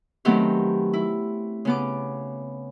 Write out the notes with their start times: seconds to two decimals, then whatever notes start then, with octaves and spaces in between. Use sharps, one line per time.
0.25 D#3 F#3 A3 B3 C4 G4
0.93 E4
1.65 C#3 B3 D6